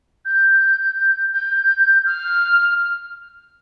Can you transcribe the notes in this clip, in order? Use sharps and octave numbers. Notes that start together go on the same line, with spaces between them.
G6
G6
F6